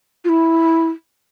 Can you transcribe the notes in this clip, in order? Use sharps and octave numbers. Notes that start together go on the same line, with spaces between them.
F4
E4